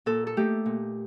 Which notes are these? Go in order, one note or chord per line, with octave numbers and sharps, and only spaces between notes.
A#2 A4
A4
A3 D#4 G4
A#2